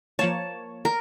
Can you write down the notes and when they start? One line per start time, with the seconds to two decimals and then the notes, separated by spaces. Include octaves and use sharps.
0.19 F3 A#3 C#5 A5
0.85 A#4